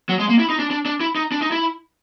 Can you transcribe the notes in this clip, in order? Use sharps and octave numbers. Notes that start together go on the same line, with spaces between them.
F#3
G#3
A#3
E4
D#4
D4
D4
D4
E4
D#4
D4
D#4
E4